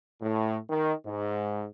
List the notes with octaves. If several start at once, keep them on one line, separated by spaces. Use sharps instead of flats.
A2
D#3
G#2